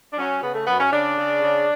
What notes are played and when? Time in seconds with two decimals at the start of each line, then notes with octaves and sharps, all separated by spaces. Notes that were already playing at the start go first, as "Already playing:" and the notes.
0.13 D4
0.18 F#3 C#4
0.43 C#3 B3
0.55 A3
0.67 F#2 B3
0.80 C#4
0.92 C#3 D4
1.17 C#3
1.41 C#3